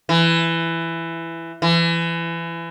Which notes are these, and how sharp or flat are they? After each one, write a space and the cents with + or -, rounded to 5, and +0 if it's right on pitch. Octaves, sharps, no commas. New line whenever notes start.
E3 +10
E3 +25